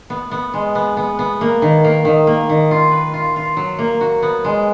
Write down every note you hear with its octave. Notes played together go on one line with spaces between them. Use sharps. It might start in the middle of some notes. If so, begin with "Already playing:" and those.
B3
B3
G#3
B3
B3
B3
A#3
D#3
A#3
D#3
A#3
D#3
F4
B4
F4
F4
F#3
A#3
F#4
B3
G#3